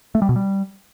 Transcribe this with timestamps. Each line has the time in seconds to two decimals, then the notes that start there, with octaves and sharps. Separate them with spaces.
0.15 A3
0.22 G3
0.29 B2
0.36 G3